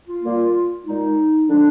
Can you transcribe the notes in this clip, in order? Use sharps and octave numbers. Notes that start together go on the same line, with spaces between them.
F4
A#2 G3 A#3
A#2 G#3 D#4
D3 F3 G#3 D4